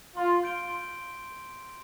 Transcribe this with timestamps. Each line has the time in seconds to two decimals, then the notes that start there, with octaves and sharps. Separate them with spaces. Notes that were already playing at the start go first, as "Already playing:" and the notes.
0.16 F4 C6
0.43 G6 D7 G7
0.70 C6